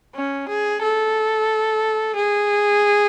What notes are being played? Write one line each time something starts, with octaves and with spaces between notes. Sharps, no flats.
C#4
G#4
A4
G#4